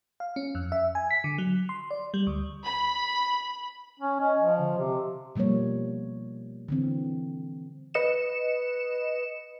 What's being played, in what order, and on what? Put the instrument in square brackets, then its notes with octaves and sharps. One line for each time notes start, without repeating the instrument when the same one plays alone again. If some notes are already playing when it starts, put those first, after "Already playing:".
[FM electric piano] F5
C#4
F2
E5
G#5
B6
D3
F#3
C6
D5
G3
D2
[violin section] B5
[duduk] C#4
[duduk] C#4 [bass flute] D#5
[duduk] F3
[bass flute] D3
[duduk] C3 [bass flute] G4
[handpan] B2 F3 G3 A#3 C#5
D3 E3 C4
[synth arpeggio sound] B4 D#5 C#7 E7